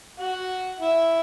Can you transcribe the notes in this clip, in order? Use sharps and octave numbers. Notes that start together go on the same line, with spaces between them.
F#4 F#5
E4 E5